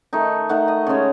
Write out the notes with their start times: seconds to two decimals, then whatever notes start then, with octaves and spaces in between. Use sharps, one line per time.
0.13 D#3 A3 D#4 G#5
0.49 D#3 A3 D#4 F#5
0.68 D#5
0.86 C#3 G#3 C#4 C#5